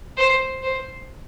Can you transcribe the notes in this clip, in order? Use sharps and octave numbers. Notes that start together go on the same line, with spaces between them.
C5
C5